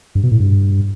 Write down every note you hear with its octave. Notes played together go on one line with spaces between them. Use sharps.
G2
B2
A2
G2